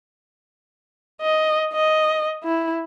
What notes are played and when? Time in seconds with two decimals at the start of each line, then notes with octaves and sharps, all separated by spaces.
1.21 D#5
1.73 D#5
2.43 E4